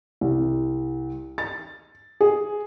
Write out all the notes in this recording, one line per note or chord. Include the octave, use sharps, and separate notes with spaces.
C2
A6
G#4